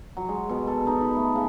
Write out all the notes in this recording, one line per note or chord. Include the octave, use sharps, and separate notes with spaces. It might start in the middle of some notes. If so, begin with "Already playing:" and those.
F#3
G#3
B2
A4
D#4
B5
A3
C#3